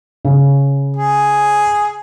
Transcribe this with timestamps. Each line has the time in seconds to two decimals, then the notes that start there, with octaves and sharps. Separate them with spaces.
0.25 C#3
0.96 G#4